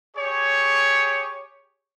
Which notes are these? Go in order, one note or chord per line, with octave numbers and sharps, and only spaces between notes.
G4 G#4 C#5